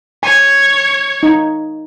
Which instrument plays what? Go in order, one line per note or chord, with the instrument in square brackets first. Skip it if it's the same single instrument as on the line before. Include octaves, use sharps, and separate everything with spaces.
[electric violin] C#5 [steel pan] G#5
[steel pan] D#4